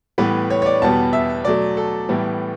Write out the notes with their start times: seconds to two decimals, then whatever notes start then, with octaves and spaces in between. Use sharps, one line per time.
0.18 A2 E3 G3 B3 B4
0.50 C#5
0.62 C#5
0.66 D5
0.82 E2 B2 G3 B3 A5
1.13 E5
1.45 B2 F#3 A3 D5
1.77 A4
2.09 A2 E3 G3 B3